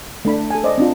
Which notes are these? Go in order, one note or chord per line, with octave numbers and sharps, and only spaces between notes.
A3 D4 B5
A4 G#5
C5 D5 D#5
C4 D4 F4